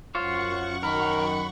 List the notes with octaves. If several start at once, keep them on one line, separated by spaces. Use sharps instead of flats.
F#2 F4 C5 C#5 F#5 C#6
D#3 A#4 B5